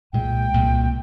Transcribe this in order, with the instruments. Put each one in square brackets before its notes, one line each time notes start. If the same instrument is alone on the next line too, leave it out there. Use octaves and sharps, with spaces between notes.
[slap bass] C2 A#2 G#3 [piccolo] G5
[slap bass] C2 A#2 G#3